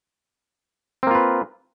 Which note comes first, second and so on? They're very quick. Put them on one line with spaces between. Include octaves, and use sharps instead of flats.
C4 A#3 F4 B4